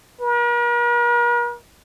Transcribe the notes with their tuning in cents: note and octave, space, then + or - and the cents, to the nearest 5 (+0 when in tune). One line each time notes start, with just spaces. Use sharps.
A#4 +45